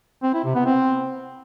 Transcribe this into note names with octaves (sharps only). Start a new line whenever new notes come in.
C4
E4
C3
B3
C4